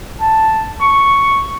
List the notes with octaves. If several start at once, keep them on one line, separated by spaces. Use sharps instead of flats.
A5
C#6